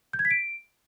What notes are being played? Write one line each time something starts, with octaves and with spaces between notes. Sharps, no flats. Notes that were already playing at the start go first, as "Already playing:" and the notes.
G6
G#6
B6
D7